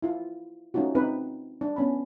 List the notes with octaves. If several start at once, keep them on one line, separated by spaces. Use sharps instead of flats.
E4 F4
A3 C#4 D#4 F4 F#4
C4 D#4 B4
D4
B3 C#4 B5